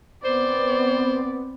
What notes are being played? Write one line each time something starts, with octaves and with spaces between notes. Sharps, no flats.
B3 C4 C5 D5